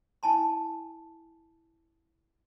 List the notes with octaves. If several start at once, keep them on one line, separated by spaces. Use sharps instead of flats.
E4 G#5 A5 C6